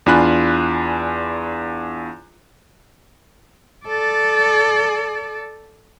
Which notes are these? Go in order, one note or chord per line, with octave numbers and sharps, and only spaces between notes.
E2 D4 F4 G#5 B5 F#6
A4 D5